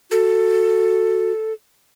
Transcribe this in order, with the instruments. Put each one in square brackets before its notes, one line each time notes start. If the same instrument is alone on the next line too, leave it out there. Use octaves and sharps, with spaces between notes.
[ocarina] F#4 [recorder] A4